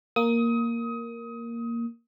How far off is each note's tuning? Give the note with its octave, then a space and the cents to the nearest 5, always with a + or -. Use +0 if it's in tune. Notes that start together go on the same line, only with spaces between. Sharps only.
A#3 +0 D#6 +25